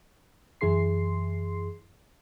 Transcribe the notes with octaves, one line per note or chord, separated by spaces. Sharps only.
F#2 E3 E4 G#4 C6 C7